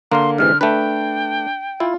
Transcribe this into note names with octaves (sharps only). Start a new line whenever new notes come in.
D3 A#3 A#4 F5 C6
G#2 C3 E3 F6
A3 D4 B4 G5
E4 F4